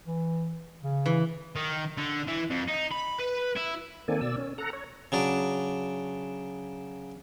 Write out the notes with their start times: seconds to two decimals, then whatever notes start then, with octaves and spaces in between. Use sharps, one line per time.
0.06 E3
0.84 C#3
1.06 E3
1.56 D#3
1.97 D3
2.27 E3
2.50 F2
2.68 D#4
2.91 B5
3.19 B4
3.56 E4
4.08 D#3 A#3 C4 A4 D5 G#5
4.21 B2 D5 E6
4.37 C#4
4.58 A4 F#5 A#5
4.73 C#5
5.12 C#3 F#3 D4